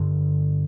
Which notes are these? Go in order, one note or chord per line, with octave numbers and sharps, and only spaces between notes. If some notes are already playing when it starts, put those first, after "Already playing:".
Already playing: G2 D3